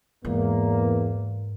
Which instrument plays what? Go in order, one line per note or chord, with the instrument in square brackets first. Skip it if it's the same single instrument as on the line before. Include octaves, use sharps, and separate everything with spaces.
[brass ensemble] E2 A#3 [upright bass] G#2